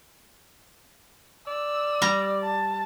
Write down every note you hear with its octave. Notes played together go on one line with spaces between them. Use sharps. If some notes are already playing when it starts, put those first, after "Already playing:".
D5 E6
G3 A#5
A5